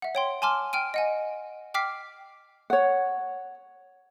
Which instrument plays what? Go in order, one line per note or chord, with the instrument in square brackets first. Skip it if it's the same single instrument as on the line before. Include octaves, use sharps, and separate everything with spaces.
[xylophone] E5 F#5
C#5 G5 C6
G#5 A5 C6 D6 F6
G5 F6 D7 D#7
D#5 F#5 G#5
G5 D6 F6 B6 C7
[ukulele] C#5 F#5